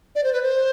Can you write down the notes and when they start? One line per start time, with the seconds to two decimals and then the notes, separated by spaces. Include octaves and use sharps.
0.15 D5
0.24 C5
0.33 B4
0.43 C5